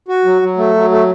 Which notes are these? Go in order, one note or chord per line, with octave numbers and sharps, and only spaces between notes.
F#4
F#3
F#3
A3
F#3
A3